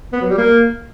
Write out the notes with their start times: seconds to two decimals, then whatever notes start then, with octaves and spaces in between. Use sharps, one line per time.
0.13 B3
0.21 F#3
0.29 G3
0.38 A#3